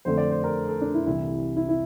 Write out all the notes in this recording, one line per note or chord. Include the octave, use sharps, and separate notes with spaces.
F2 D3 A3 C4 C5
D5
C5
A#4
A4
D4
E4
C2 C3 E3 E4
E4
E4